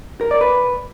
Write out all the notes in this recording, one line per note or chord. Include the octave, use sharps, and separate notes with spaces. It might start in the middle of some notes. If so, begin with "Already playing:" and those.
A#4
D5
B4